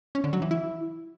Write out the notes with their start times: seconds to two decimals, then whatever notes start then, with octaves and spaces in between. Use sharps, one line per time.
0.15 C#4
0.24 D3
0.33 F#3
0.42 E3
0.51 E4